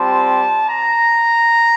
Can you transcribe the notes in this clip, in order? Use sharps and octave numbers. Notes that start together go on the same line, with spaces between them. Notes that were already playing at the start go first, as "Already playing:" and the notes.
Already playing: G3 C4 F4 A5
A#5